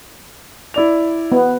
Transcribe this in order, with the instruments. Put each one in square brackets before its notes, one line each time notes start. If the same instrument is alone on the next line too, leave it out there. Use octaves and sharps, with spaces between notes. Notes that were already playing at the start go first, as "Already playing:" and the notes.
[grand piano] E4 D5 F7
[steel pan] B3